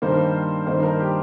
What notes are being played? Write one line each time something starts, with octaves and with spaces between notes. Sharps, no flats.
G2 D#3 A#3 C5
G2 D#3 A#3 C5
A#4
G4